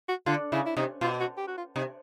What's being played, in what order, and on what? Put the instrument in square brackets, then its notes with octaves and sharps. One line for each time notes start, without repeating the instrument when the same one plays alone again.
[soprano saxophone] F#4
[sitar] D3 [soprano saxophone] F4
[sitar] C#3 [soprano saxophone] E4
[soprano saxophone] E4
[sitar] C3 [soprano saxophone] D#4
[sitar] B2 [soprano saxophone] F4
[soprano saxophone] F#4
G4
F#4
F4
[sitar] C3 [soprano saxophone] D#4